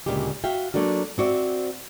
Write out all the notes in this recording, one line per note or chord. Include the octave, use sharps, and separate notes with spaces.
D2 A#2 C#3 G#3 G4
F#4 E5 F5 G5
F#3 A3 A#3 D4 F#4
C4 F#4 D5 E5